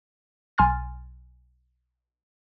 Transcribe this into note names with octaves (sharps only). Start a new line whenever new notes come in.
B1 G#5 C6 F6 A6